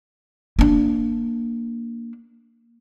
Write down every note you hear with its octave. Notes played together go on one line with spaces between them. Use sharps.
A#3 D4